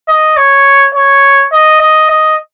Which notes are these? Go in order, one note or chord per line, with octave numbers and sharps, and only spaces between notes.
D#5
C#5
C#5
D#5
D#5
D#5